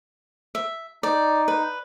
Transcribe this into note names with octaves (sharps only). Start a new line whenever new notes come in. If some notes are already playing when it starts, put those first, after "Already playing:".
E5
D#4 D5
B4